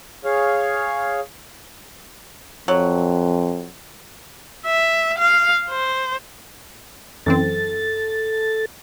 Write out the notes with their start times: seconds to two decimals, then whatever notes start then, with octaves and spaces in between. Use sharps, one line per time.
0.25 G#4 C#5 F5
2.68 F2 F#3
4.65 E5
5.18 F5
5.70 C5
7.26 F#2 E3 C4 A4 A6